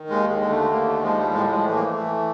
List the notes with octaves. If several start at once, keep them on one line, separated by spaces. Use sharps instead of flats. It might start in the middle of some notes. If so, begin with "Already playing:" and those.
Already playing: D#3
D#2 G#3
G#3
D3
A3
D#2 A#3
A3
F3 G#3
G3
A2 G#3
G3
G#3
E3 A3
A#3
A3
E3